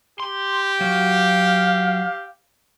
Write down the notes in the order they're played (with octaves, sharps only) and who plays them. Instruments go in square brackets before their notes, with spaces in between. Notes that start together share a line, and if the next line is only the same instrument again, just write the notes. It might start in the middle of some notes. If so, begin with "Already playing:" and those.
[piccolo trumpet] G4 [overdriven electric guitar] C6
[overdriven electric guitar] F#3 [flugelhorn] F5